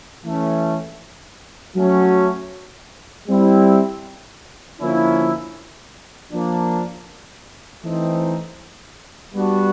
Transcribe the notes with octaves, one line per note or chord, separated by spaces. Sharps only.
E3 A3 C#4
F#3 A3 C#4 F#4
G3 C4 E4
D3 F3 A#3 C#4 E4
F3 A#3 D4
E3 A3 C4 D#4
G3 B3 D4 F#4